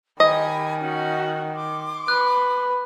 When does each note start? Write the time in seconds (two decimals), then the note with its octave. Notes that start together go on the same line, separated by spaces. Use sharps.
0.20 D#3 G4 D#5 G#5 B5
0.80 C#4 D#4 F#4
1.55 C6 D6
2.08 B4 F#6